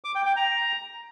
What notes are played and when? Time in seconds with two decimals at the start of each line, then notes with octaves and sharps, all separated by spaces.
0.04 D6
0.15 G5
0.26 G5
0.36 A#5